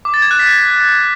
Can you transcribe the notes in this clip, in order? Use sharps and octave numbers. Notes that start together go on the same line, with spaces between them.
D6
A6
G#6
F#6
B6